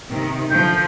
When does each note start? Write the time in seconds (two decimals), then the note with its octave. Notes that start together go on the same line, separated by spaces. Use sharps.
0.10 C3 D#3
0.50 D3 F3 G6